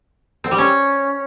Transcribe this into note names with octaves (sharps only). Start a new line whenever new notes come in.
C4
G3
C#4